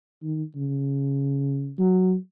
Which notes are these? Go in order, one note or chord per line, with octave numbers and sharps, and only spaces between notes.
D#3
C#3
F#3